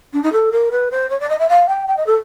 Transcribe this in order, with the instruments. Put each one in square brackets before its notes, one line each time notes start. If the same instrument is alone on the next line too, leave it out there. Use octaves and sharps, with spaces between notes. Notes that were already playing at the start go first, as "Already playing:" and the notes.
[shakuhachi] D4
D#4
A4
A#4
B4
C5
C#5
D5
D#5
E5
F5
G5
G5
D#5
A4